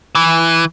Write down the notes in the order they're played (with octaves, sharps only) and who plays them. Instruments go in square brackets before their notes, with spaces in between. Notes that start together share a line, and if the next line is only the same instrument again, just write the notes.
[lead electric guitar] E3